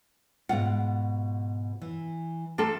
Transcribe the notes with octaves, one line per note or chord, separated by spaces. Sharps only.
G#2 B2 F4 F#5
E3
A3 D4 F4 A4 A#4